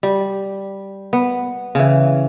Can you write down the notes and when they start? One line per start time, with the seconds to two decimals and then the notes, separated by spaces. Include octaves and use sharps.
0.03 G3
1.13 B3
1.75 C#3 E3